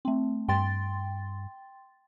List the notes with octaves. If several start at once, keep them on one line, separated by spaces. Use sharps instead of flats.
A3 C4
G2 G5 C6 A6